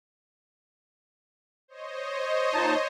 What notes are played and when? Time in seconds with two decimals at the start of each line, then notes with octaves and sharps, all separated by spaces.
1.68 C5 C#5 D#5
2.54 A#2 D#4 A5